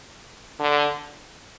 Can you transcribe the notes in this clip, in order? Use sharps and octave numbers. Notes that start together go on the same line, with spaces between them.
D3